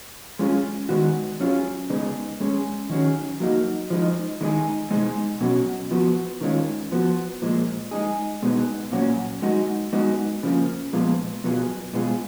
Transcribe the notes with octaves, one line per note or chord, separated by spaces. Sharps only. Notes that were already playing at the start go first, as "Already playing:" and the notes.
G#3 C#4 F4 G#4
D#3 G#3 B3 F#4
F#3 C#4 F4 G#4
C#3 G#3 B3 D#4 G#4
G#3 C#4 G#4
D#3 F#3 C#4 G#4
F#3 A#3 D#4 F#4
F3 G#3 D#4
D#3 G#3 D#4 G#4
B2 G#3 D#4 G#4
B2 F#3 C#4 F#4
F3 B3 F#4
D#3 G#3 C#4 F4
F3 B3 F#4
A#2 F3 G#3
G#3 D#4 G#4
B2 G#3 B3 D#4 G#4
A#2 F#3 C#4 F#4
G#3 D#4 F#4
G#3 B3 D#4 F#4
C#3 F3 A#3
A#2 F3 G#3 B3 F4
B2 F#3 B3 F4 G#4
B2 G#3 B3 F4 G#4